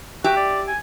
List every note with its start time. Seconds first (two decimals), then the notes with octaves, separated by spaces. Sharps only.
0.24 F#4 G4 E5
0.37 D5
0.68 G#5